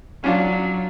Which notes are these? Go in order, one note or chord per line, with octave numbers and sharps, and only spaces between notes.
F#3 C#4 D4 F4